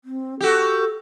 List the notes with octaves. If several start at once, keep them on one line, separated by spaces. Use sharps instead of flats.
C4
F#4 G4 A4